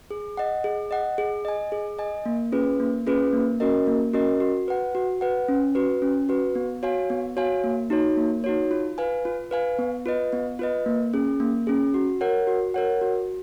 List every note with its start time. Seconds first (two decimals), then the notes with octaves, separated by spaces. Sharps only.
0.11 G#4
0.37 D#5 F#5
0.64 G#4
0.91 D#5 F#5
1.18 G#4
1.45 D#5 G#5
1.72 G#4
1.99 D#5 G#5
2.26 A#3
2.52 C#4 F4 G#4 B4
2.80 A#3
3.06 C#4 F4 G#4 B4
3.33 A#3
3.60 C#4 F#4 A#4 D#5
3.87 A#3
4.13 C#4 F#4 A#4 D#5
4.40 F#4
4.68 B4 F#5
4.95 F#4
5.21 B4 F#5
5.48 C#4
5.75 F#4 B4
6.02 C#4
6.29 F#4 B4
6.55 B3
6.83 F#4 C#5 F5 G#5
7.10 B3
7.37 F#4 C#5 F5 G#5
7.64 A#3
7.90 D#4 F#4 C#5
8.17 A#3
8.44 D#4 F#4 C#5
8.71 F4
8.98 B4 F5 G#5
9.25 F4
9.51 B4 F5 G#5
9.79 B3
10.06 F4 B4 D#5
10.33 B3
10.59 F4 B4 D#5
10.86 A#3
11.13 C#4 G#4
11.40 A#3
11.67 C#4 G#4
11.94 F#4
12.21 A#4 C#5 F#5
12.47 F#4
12.74 A#4 C#5 F#5
13.01 F#4